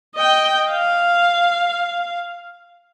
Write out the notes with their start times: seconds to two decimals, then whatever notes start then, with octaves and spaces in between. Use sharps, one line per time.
0.15 D#5 G5
0.70 F5